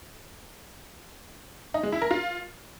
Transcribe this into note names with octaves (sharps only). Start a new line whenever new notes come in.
D#4
G#3
E4
A#4
F4